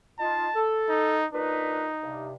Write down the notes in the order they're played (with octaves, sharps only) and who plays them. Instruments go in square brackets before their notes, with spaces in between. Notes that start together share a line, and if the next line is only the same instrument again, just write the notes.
[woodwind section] D#4 F4 [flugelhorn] A5
[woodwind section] A4
[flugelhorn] D#4
[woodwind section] A#2 D4 B4 [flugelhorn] D#4
[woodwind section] G2 C3